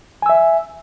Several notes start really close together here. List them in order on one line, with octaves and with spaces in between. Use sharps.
G#5 E6 E5